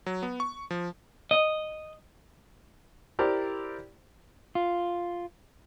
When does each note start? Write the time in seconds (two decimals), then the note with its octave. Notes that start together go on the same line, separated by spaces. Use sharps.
0.06 F#3
0.23 B3
0.40 C#6
0.71 F3
1.31 D#5
3.19 E4 G4 A#4 C5 D5
4.55 F4